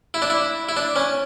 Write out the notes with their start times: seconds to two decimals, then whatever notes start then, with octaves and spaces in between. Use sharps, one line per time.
0.14 E4
0.22 D4
0.30 E4
0.69 E4
0.77 D4
0.96 C#4